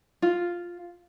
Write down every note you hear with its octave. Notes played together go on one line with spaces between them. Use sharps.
F4